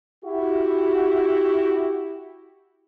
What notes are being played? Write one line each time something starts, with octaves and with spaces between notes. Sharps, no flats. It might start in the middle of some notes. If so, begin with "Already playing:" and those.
E4 F#4 G4